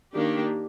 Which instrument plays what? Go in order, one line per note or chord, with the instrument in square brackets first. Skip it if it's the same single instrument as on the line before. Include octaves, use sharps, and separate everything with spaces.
[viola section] D#3 A#3 D4 G4